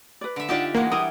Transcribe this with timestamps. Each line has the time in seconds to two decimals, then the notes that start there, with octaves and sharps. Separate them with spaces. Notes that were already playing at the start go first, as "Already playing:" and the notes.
0.21 B4 D5
0.36 D3 E5
0.49 D4 D#4 F4 G4 D5 F#5 A5
0.74 E3 G#3 A#3 F#5
0.92 G3 E4 A#4 D#6